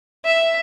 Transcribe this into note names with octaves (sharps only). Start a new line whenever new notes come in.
E5